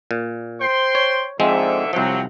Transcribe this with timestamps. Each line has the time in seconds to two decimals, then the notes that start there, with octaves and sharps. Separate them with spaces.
0.11 A#2
0.61 C5 G5 C6
0.95 C#5
1.40 G#2 D3 F3 G#3 C4 E5
1.93 C2 C3 F3 F#3 C4